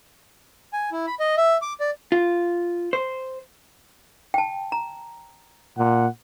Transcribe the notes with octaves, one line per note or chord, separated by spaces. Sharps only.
G#5
E4
B5
D#5
E5
D6
D5
F4
C5
G5 A5
A#5
A#2 F#5